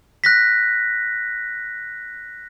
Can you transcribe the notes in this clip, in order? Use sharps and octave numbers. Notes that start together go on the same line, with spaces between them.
F#6 A#6 B6